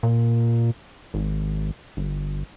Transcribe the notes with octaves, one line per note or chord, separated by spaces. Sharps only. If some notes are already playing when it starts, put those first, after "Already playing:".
A#2
G#1
G1